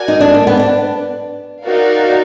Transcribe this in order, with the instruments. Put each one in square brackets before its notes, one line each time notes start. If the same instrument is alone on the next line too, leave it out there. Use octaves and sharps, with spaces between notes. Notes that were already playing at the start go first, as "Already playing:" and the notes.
Already playing: [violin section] F#4 A#4 D5 G#5
[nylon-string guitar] D#4
D4
A#3
B3
D4
[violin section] D#4 F#4 A#4 D5 F5